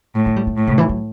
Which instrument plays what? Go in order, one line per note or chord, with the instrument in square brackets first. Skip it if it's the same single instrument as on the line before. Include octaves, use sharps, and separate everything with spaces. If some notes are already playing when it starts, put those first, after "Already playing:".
[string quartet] A2
[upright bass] A3
G3
A3
[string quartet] A2
[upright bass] C3
E3
F#3